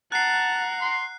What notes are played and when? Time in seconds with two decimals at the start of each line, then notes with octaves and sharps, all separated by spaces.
0.12 F#5 A5 A#5 F#6 C7
0.81 C6